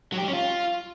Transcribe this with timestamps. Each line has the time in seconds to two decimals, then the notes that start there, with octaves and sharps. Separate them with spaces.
0.12 F#3
0.17 G4
0.23 G3
0.28 C#4
0.33 F4